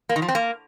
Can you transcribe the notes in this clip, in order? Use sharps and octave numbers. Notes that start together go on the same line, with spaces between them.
A#3
D#3
F3
C4
A#3